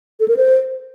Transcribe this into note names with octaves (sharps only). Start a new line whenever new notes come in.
A4
A#4
C5